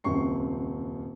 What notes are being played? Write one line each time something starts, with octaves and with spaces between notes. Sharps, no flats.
D#1 C#2 F#2 C4 C#6 C7